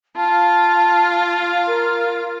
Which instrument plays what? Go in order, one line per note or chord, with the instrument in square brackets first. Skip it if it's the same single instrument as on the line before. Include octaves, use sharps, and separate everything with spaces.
[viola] F4 F5 [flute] A5
[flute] A#4